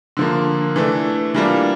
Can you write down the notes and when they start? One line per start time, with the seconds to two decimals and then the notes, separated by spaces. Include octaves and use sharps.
0.17 D3 F3 A#3
0.76 E3 A3 D4
1.34 E3 G3 A#3 D4 F4